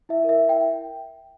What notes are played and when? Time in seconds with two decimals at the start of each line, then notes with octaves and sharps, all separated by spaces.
0.09 E4 E5
0.24 A#4 E5
0.40 E4
0.49 E5 G5